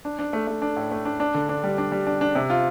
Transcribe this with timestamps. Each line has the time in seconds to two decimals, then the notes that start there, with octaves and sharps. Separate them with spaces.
0.05 D4
0.19 D4
0.33 A3
0.47 A3
0.62 D4
0.77 A2
0.91 A3
1.05 D4
1.20 D4
1.34 D3
1.49 D4
1.64 G3
1.78 D4
1.92 G3
2.07 D4
2.21 D4
2.35 C3
2.50 F4